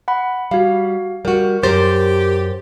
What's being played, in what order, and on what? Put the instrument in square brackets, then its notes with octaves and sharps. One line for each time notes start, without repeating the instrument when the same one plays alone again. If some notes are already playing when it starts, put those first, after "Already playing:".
[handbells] F#5 B5
[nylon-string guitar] G3 [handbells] F#4 F5
[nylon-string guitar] G3 F#4 [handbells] A#4
[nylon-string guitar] F#2 A#4 C5 [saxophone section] G4 [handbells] A6